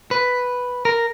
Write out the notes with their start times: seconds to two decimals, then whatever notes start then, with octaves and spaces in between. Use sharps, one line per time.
0.11 B4
0.85 A#4